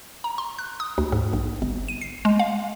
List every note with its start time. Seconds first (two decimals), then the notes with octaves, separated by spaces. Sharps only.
0.24 A#5
0.38 C6
0.59 F#6
0.80 D#6
0.98 D2
1.12 G#2
1.33 A#1
1.62 G1
1.88 D#7
2.01 C7
2.25 G#3
2.39 F5